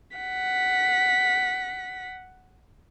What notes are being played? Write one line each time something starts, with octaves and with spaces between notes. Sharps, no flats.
F#5 B6